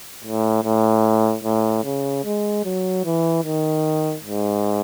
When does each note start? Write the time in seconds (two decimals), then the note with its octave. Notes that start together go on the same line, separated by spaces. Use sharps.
0.25 A2
0.64 A2
1.44 A2
1.85 C#3
2.25 G#3
2.65 F#3
3.05 E3
3.44 D#3
4.24 G#2